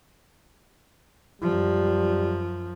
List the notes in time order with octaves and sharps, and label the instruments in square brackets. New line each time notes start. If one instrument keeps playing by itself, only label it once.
[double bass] F#2 F3 [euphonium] G3